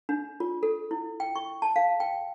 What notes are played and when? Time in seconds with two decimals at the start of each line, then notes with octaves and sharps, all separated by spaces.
0.09 D4
0.40 F4
0.63 A4
0.91 E4
1.20 G5
1.36 C#6
1.62 A5
1.76 F5
2.00 G5